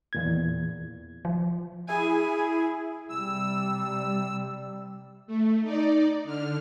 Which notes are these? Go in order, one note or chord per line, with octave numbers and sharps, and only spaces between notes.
E2 A#2 G#6
F3
E4 G#4 G#5
C3 G3 E6
A3
D#4 D5
D3 F6